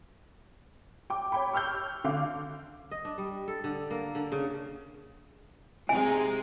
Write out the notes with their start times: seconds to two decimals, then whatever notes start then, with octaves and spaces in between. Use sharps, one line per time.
1.10 G5 D6
1.32 C#5 G5 B5
1.53 C#6 E6 F6 G6
2.04 D3 F5 D6
2.91 D#5
3.05 D4
3.18 G3
3.48 A4
3.64 D3
3.91 A#3
4.15 D3
4.32 C#3
5.89 C3 G#3 D#4 G#5